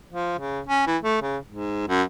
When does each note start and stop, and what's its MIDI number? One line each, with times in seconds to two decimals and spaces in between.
0.09 0.37 53
0.38 0.60 49
0.67 0.85 61
0.87 0.97 52
1.03 1.17 57
1.22 1.38 49
1.48 1.86 44
1.88 2.03 42